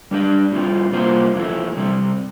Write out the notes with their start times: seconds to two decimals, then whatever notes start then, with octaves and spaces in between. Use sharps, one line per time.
0.11 G3 D4 G4 D5
0.52 A2 G3 C4 F4
0.93 C3 G3 A#3 F4 C5
1.35 F2 E3 A3
1.77 C3 G3 C4